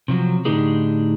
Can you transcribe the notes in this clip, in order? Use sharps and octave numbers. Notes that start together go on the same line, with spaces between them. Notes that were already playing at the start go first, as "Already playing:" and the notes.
C3 F3 F#3
A2 D3 D4 D#4 G4 G#4